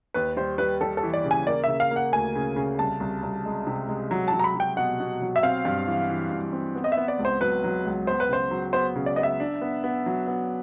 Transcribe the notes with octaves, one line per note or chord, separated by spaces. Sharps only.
D#2 B4
G3 C5
G3 B4
G3 A4
A4
E3
D5
C#3
G#5
A#3 D5
C#3 E5
F5
A#3
F#5
D2 G#5
C#3
C#3
C2 A5
C2
C2
G#3
C3
G#3
F#3
F#3 A5
A#5
B5
F#3
G5
B2 F#5
B2
F#3
E5
C4 F5
G2
E3
E3
G2
C4
B3
D#5
E5
B3
D5
C#2
C5
F#3 B4
F#3
C#2
B3 C5
B4
C#3 C5
F#3
B3 C5
C#3
D5
B3 D#5
E5
D4
B3
B3
F#3
B3